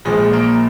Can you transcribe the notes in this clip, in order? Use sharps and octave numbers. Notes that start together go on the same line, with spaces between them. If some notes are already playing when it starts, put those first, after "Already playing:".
A#1 A#2 F3 G#3
A#3